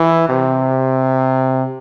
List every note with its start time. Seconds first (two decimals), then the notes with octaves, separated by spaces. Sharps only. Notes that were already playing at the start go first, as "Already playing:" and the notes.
Already playing: E3
0.29 C3